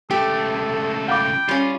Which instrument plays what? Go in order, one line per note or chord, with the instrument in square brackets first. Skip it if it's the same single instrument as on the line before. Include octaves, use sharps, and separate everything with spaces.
[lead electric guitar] C#2 A3 [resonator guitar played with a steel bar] G4 [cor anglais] A4
[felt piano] F5 B5 D6 [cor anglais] G5
[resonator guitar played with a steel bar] G3 C#4 [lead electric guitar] F4